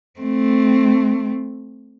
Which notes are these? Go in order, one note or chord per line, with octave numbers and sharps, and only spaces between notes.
A3 C4